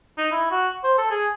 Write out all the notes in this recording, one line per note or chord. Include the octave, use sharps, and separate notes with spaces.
D#4
E4
F#4
C5
A4
G#4